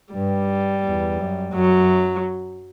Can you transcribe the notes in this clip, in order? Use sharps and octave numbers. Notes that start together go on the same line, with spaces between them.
G2 G3
E2
F#2
F#2 F#3